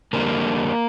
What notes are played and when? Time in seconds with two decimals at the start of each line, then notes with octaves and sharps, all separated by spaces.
0.13 F2 D3 G3 A#3